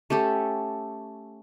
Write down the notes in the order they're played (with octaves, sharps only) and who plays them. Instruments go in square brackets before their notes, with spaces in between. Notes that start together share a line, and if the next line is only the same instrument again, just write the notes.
[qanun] A3 C#4 G4 A4